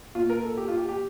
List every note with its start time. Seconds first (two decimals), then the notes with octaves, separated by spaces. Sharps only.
0.15 A#2 F4
0.29 A#4
0.43 A4
0.57 G4
0.68 F4
0.77 G4
0.89 G4